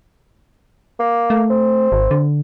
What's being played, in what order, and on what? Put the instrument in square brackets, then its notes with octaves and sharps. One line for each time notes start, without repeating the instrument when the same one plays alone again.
[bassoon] A#3
[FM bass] A3
[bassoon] C4
[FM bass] G#1
D3